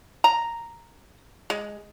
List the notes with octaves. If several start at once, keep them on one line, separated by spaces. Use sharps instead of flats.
A#5
G#3